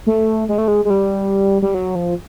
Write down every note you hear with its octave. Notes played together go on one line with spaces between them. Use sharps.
A3
G#3
A3
G#3
G#3
G3
G3
F#3
F3